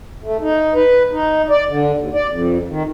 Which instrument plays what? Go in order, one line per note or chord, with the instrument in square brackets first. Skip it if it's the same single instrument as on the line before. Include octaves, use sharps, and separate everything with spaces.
[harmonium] A3
D#4
B4
D#4
D5
D3
D#2
D5
F2
D#3